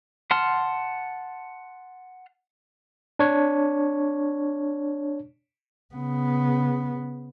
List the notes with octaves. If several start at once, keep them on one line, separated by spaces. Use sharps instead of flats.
F#5 A5 C6 F6
D4 C#5
C#3 B3